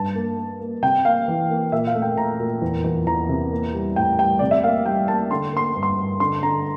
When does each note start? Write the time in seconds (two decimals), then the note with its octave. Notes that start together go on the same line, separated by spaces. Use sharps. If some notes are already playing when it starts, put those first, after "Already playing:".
Already playing: G2 A5
0.15 A#3
0.38 A#3
0.61 A#3
0.83 C3 G5
1.05 A#3 F5
1.28 E3
1.50 A#3
1.72 A#2 E5
1.87 F5
1.95 A3
2.02 G5
2.17 A#2 A#5
2.39 A#2
2.62 E2
2.84 E2
3.07 E2 A#5
3.29 C3
3.52 A#3
3.74 G3
3.96 A2 G5
4.19 G3 G5
4.39 C3 D5
4.51 E5
4.64 A#3 F5
4.86 G3 G5
5.08 A#3 A5
5.31 D3 C6
5.53 A#3 C6
5.75 G2
5.83 C6
5.98 G2
6.20 D3 C6
6.43 D3 A#5